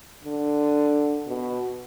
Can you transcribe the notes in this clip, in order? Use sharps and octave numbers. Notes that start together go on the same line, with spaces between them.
D3
B2